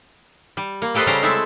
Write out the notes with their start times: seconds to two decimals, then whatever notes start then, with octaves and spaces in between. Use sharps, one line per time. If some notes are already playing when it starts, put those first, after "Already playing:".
0.57 G3
0.82 A#3
0.95 G3 G4 A4 B4 C5 D#5
1.07 C#3 G3 C#4 G4 C5 A#5
1.23 G#3 A3 C4 E4 A4